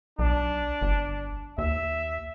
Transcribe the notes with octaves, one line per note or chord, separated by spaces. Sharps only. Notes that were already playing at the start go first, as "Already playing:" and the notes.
B1 D4
G1
D#2 E5